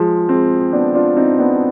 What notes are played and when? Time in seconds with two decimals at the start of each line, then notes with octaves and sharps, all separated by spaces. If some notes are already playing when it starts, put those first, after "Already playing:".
Already playing: F3 G#3
0.29 G#3 C4
0.73 B3 D4
0.94 D4 F4
1.17 C4 D#4
1.38 B3 D4